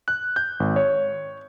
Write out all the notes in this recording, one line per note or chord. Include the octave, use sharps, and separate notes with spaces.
F#6
G6
G#1
C#5